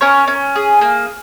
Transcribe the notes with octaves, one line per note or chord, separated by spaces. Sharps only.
C#4 A#4 C#5
C#4
G#4
A#3